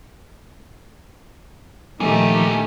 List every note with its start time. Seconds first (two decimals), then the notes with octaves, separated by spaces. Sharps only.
2.00 A#2 D#3 F3 A3 D4 D#4 G4 G#5